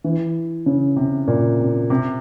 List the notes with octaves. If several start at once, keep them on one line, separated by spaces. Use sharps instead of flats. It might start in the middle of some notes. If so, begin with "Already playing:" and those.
E3
C#3
C3
A#2
C3
C3